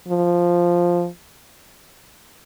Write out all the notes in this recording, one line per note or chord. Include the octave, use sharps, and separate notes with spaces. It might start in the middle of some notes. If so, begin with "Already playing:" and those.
F3